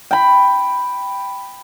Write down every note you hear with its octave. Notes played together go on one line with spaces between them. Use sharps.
G5 B5